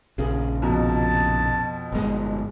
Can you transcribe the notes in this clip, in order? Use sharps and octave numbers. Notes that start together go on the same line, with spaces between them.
A#1 C#3 G#4
F2 B2 A5 A#5
G1 G#3